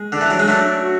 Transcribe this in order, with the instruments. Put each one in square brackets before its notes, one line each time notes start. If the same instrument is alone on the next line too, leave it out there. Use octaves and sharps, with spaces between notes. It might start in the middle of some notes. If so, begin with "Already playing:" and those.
Already playing: [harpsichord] G#3
[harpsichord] D3 [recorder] D4
[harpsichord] E3
F#3
G#3
[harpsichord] F#3 A3 [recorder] D4
[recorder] D4
F#4